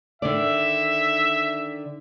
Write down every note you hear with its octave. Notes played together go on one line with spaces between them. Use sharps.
D3 D#3 D5 E5